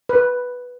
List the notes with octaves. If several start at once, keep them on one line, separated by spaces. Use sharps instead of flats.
B4